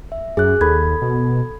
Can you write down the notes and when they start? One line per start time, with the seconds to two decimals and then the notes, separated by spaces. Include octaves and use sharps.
0.12 E5
0.37 F#2 G#4 F#6
0.61 D#2 A4 B5 G#6
1.02 B2